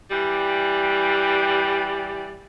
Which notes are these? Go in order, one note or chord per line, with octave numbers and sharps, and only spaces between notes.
E3 G3